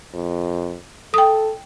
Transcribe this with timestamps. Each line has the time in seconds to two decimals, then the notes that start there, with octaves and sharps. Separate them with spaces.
0.14 F2
1.14 A4 G5 D#6